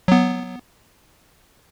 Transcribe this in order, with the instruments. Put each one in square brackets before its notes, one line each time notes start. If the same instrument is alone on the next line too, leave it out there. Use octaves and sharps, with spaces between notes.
[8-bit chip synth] F#3 B3